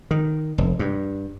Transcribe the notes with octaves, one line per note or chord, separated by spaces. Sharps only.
D#3
F1
G2